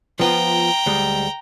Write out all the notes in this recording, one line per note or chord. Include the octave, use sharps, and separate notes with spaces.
F3 B3 F4 G5 A#5
D2 G3 G#3